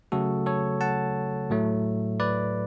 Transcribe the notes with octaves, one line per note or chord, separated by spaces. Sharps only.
C#3 F#3 A3 F#4 A4
A4 C#5
F#5 A5
A2 F#3 A3
B4 D5